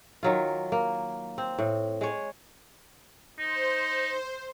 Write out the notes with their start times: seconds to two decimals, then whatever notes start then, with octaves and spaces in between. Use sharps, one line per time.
0.23 D#3 F#3 F4
0.72 A#3
1.38 C4
1.58 A2
2.01 G#3 C#5
3.39 D#4 C5